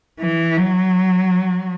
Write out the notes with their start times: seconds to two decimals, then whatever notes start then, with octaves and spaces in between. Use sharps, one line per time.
0.20 E3
0.57 F#3